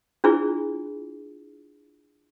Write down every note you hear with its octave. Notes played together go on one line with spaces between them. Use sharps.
D4 E4 F4 G#4